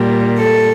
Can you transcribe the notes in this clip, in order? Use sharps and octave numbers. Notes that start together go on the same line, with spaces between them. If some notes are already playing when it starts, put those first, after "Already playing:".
Already playing: A#2 G3
A4